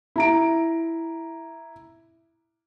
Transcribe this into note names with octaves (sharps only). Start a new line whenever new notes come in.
E4 A#5 D7